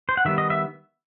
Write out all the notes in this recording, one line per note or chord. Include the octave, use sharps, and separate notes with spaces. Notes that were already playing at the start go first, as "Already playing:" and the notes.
C5
F#5
D#3 G3 B3 E5
D#5
E5